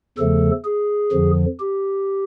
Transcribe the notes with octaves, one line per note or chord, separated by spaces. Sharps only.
E2 C#3 F3 A3 A4
G#4
F2 D3 F3
G4